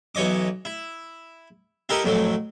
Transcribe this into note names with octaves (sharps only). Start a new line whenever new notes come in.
B1 E3 C#5 D#5 D6
E4
E4 G4 A4 A#4 D#5 A#5
F2 A2 F#3 A3